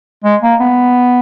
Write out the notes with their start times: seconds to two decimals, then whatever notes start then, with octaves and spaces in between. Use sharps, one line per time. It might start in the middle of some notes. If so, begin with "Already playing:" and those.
0.24 G#3
0.42 A#3
0.60 B3